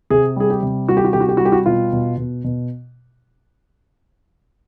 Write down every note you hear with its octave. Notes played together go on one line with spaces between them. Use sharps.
C3 G#4
G3 G#4
G4
C3
G3 F#4
G4
F#4
C3 G4
F#4
G4
G3 F#4
G4
F#4
B2 F4
B2
B2
B2